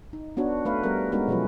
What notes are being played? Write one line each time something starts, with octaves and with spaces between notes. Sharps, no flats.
D#4
B3 D4 F#4 C#5
A3 B4 F5
G3 B3 G4 A#4
G#3 B3 C#4 D#4 F#4 A#4
B2 F3 F#3 E4 B4